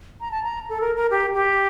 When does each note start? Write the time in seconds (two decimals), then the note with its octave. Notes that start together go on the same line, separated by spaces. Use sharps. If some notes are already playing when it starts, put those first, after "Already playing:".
0.21 A#5
0.31 A5
0.44 A#5
0.69 A4
0.81 A#4
0.96 A#4
1.11 G4
1.34 G4